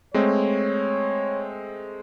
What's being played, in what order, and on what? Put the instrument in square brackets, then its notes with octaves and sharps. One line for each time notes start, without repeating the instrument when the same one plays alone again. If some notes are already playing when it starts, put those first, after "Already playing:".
[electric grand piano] G#3 A3 C4 [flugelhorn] C#5